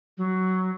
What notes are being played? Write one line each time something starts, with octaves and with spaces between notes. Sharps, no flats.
F#3